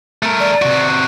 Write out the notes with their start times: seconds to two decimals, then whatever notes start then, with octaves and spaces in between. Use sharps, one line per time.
0.23 A3 A#4
0.40 D5
0.62 C3 F#4